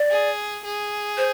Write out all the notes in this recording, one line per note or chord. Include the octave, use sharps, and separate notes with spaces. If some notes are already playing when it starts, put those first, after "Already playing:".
Already playing: D5
G#4
G#4
C5